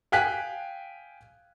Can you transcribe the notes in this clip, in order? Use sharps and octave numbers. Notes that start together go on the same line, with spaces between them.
F5 G5 G#5 F#6 B6